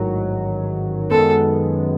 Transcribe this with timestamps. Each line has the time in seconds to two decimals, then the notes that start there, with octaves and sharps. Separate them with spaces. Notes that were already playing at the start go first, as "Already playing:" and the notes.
Already playing: A1 G#2 D#3 F#3
1.11 F#2 D#3 G#3 B3 A4